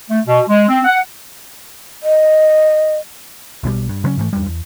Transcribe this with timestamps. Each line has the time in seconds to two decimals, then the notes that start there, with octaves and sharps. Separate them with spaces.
0.10 A3
0.26 B2
0.48 G#3
0.69 C4
0.85 F#5
2.03 D#5
3.63 B1 B2 D#3 G3
3.89 G2
4.04 C#3 F#3 G#3 C#4
4.17 G#2 E3 A3
4.33 E2 G2 G3
4.46 E2